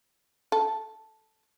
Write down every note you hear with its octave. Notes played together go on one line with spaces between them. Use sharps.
A4